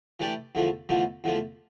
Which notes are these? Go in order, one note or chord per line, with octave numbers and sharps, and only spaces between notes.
E3 A3 D4 G4 D5
E2 D3 F3 A3
E2 D3 F3 A3
E2 D3 F3 A3